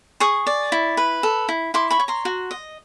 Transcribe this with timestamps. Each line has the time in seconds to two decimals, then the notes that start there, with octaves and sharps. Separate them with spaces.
0.20 G#4 C#6 D#6
0.47 D5
0.72 E4
0.97 B4
1.23 A4
1.49 E4
1.74 E4 C6 D6
1.90 B5 C#6
1.99 C#5
2.08 A#5 C6
2.25 F#4
2.51 D#5